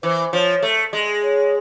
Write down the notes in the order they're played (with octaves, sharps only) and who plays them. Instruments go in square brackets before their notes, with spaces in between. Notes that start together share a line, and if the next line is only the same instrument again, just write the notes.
[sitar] E3 [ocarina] C5
[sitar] F3 [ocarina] C#5
[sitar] A3
G#3
[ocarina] C#5